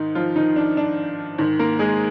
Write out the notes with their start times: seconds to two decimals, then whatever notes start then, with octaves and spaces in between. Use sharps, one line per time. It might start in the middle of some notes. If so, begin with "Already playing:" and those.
Already playing: G#2 D#3 D#4
0.15 F3 F4
0.36 D#3 D#4
0.56 D4
0.77 D4
1.38 G#2 D#3
1.59 A#3 A#4
1.79 G#3 G#4